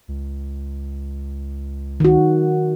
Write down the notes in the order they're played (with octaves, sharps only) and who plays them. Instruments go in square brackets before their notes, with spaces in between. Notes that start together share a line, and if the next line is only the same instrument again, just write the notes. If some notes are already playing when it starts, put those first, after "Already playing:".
[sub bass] C#2
[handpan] D#3 F#4